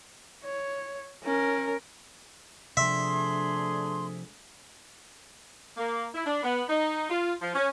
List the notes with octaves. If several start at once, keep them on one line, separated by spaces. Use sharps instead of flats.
C#5
C#4 A#4
C3 F3 A3 D4 G#4 E5 C6
A#3
E4
D4
B3
D#4
F4
F3
C#4